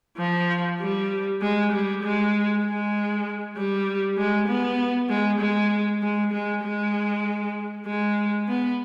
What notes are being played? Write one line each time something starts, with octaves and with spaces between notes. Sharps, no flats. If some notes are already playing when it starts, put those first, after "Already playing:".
F3
G3
G#3
G3
G#3
G#3
G3
G#3
B3
G#3
G#3
G#3
G#3
G#3
G#3
B3